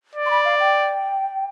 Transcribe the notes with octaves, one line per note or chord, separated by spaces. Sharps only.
D5
C6
B5
F5
G5